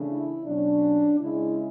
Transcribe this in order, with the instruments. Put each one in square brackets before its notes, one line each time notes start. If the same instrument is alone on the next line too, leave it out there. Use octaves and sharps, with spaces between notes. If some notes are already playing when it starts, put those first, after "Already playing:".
Already playing: [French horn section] C#3 E3 A3 D4
E4
B2 F#3 C#4 D4
C#3 G#3 D4 E4